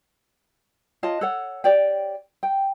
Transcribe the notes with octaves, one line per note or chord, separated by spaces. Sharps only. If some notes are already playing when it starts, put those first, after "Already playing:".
F4 C#5 D#5 A5
A4 C#5 F#5
G4 C#5 D5 G5
G5